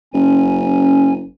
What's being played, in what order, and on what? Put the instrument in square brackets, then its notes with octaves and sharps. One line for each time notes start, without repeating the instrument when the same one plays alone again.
[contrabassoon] F#1 [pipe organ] C#4 G#5